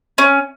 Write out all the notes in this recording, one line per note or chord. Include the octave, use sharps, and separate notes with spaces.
C#4